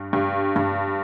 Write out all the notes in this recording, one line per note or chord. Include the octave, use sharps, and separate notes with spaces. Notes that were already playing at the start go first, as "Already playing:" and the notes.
Already playing: G2
G2
G2